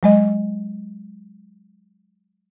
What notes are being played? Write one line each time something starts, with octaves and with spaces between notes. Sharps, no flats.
F#3 G#3 D#5